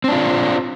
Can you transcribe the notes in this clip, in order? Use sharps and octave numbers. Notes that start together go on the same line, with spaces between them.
C4 D4 F4